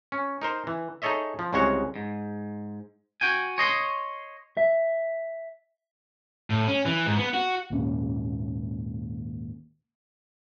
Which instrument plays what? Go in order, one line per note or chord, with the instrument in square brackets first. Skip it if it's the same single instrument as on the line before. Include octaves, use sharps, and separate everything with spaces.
[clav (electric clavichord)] C#4
D#4 A#4 C5
E3
D#4 G#4 A4 C#5 D#5 E5
F3
C2 C#3 G#3 F#4 C#5
[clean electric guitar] G#2
F#4 G5 G#5
C#5 D#5 C6
E5
[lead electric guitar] A2
C#4
E3
G#2
B3
F#4
[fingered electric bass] G#1 D#2 A#2 C#4